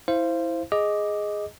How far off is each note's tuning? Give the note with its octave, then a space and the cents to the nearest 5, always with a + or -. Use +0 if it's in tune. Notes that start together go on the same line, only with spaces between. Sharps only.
E4 -10 C5 +0 F5 -30
G#4 +0 D#5 +0 D6 +0